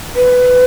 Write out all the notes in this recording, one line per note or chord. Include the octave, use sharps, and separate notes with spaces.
B4